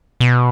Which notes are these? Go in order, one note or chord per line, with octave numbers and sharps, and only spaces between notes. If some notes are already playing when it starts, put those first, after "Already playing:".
B2